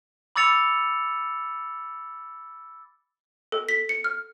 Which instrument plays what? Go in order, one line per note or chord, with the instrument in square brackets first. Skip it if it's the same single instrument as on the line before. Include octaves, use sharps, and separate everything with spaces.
[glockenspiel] B5 D6 E6 A6 C#7 F7
[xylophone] A4
B6
C#7
F6